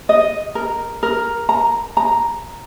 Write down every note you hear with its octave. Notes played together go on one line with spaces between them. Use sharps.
D#5
A#4
A#4
A#5
A#5